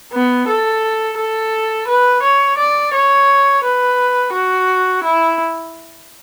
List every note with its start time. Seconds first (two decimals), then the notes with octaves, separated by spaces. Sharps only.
0.13 B3
0.48 A4
1.18 A4
1.88 B4
2.23 C#5
2.58 D5
2.94 C#5
3.64 B4
4.33 F#4
5.04 E4